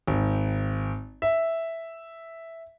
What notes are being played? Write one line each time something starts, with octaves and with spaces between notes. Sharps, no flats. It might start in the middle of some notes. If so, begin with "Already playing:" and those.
G#1
E5